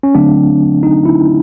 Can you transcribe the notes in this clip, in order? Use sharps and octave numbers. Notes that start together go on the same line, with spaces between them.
C#4
D3 F#3 A3 C4 D4
D#4
E4